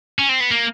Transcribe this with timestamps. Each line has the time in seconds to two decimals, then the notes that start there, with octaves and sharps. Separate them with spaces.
0.19 C#4
0.29 C4
0.40 B3
0.50 A#3